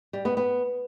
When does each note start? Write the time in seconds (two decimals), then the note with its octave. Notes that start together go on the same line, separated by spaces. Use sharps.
0.13 G3
0.25 B3
0.37 B3